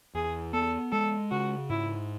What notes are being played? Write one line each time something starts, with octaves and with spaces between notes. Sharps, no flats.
E2 G#4
B3 A4
G#3 A4
C#3 F#4
G#2 E4